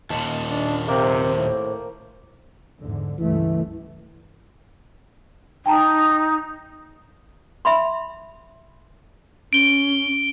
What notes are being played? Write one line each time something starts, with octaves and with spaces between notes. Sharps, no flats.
D#2 A#2 A5
D4
C3 A#3 C5 G5
A2
E2 G#2 D3
C#2 G2 E3 A3
D#4 G5 A5 A#5
E5 B5 C6
C#4 D7 G7